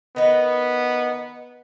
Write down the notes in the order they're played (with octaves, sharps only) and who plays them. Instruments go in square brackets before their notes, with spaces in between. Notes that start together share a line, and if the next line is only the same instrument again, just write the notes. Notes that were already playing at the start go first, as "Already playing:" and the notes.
[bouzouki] D#3 D#4 [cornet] B3